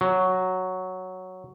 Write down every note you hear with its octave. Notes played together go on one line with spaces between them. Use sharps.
F#3